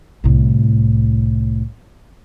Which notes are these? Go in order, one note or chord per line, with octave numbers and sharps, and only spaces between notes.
C2 A2